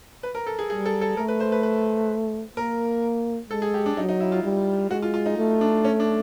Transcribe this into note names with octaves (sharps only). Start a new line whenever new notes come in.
B4
A#4
A4
G#4
G3 G#4
A4
A4
A3 A#4
B4
C5
B4
B4
A#3 A#4
G#3 A4
G#4
G4
D4
F#3 D#4
D#4
E4
F4
G3
G#3 F#4
F4
F4
D#4
A3
D4
C#4
D4